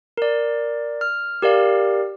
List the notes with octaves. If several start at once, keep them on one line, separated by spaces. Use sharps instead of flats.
A#4 D5
F6
G4 A#4 D5 F5